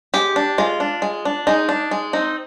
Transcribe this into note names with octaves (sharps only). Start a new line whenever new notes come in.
G#3 G4
D4
G#3 F4
D4
G#3
D4
G#3 D#4
D4
G#3
C4 D#4